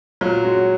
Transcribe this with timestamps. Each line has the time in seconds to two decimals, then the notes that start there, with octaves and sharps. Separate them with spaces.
0.21 A#2 F#3
0.44 G#3 C#4 F#4